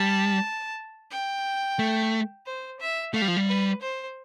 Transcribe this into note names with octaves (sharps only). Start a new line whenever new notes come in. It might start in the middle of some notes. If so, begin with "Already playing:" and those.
Already playing: G3 A5
G5
A3
C5
E5
A3 F5
G3
F3
G3
B4
C5